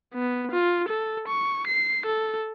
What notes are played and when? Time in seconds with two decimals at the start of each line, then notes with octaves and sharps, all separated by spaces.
0.14 B3
0.51 F4
0.89 A4
1.28 C#6
1.67 C7
2.06 A4